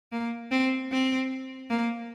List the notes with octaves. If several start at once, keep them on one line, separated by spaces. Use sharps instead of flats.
A#3
C4
C4
A#3